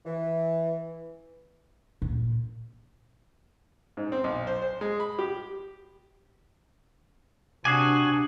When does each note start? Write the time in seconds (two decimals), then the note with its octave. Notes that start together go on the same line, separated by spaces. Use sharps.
0.06 E3
2.02 A#2
3.97 G#2
4.12 C4
4.24 B1
4.47 C5
4.62 C5
4.81 G#3
5.00 B5
5.19 G4
7.65 C3 D4 F#4 G#5 D6 D#6 C7